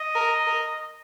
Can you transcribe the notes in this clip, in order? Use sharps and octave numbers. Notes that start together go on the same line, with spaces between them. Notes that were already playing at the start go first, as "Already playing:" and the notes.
Already playing: D#5
A#4
A#4